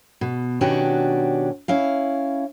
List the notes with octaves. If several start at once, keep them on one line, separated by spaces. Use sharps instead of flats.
B2
B2 D#3 C#4 D4 F#4 G4
C#4 E4 F5